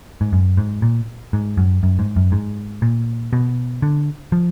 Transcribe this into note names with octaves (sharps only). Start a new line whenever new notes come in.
G#2
F#2
G#2
A#2
G#2
F#2
F#2
G#2
F#2
G#2
A#2
B2
D3
F3